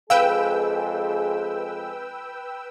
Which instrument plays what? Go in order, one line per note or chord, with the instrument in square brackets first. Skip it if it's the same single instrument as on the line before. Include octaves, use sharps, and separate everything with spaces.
[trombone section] F2 G#3 G#4 [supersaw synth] B4 G5 E6 [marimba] F5